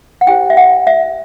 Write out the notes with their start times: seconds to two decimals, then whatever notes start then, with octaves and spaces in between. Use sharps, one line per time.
0.21 F#5
0.27 E4 G4 C5 G5
0.50 E5
0.57 F#5
0.87 E5